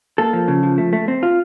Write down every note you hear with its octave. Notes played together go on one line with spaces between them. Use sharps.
A#3 A4
F3
C#3
F3
A3
A3
C4
F4